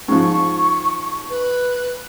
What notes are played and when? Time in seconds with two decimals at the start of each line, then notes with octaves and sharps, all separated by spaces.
0.08 G#2 F3 C#6
1.30 B4